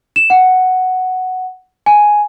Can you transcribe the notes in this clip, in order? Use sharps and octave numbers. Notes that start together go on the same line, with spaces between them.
E7
F#5
G#5